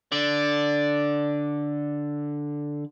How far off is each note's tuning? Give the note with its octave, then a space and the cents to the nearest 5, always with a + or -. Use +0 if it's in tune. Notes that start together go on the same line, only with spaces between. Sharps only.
D3 +0 D5 +0